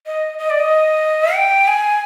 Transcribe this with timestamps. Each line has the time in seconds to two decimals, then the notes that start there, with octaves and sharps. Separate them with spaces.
0.06 D#5
0.39 D#5
0.50 D5
0.59 D#5
1.34 G5
1.68 G#5